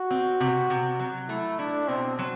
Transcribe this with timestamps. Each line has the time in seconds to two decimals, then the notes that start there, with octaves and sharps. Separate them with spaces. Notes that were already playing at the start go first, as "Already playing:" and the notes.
Already playing: F#4
0.11 C4
0.40 C3
0.70 C3
1.00 F#3
1.29 A3 E4
1.59 D4 E4
1.88 B2 C4
2.19 F#3